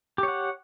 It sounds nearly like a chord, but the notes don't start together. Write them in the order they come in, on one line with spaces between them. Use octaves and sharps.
G4 C#5 F#5